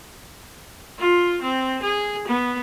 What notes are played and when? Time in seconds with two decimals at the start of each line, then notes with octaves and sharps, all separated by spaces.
0.99 F4
1.42 C4
1.82 G#4
2.27 B3